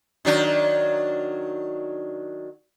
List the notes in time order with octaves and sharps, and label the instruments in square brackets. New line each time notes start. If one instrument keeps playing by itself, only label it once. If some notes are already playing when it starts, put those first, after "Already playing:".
[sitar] D#3 F#3 D4